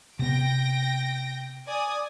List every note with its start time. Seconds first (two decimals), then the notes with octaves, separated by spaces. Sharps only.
0.19 C3 B3 G5 A#6 D7
1.67 D5 G#5 D#6